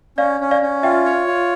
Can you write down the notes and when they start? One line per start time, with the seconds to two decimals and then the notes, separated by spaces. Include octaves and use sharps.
0.18 C#4 D5 F5
0.41 C#4
0.51 D5 F5
0.62 C#4
0.83 F4 E5 G5
1.05 C#5
1.27 F4